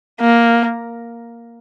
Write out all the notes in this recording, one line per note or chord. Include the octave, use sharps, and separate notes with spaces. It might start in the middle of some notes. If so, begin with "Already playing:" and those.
A#3